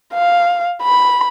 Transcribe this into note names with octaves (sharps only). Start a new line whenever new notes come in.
F5
B5